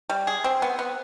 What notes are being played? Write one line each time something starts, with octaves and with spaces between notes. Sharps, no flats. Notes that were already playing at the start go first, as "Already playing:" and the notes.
G3
G#4
C4
B3
B3